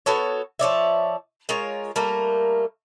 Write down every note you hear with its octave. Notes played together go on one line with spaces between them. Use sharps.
B3 F#4 A4 C#5
F3 C#5 D5 E5
G#3 F4 A#4 C#5
G3 A3 A#3 A#4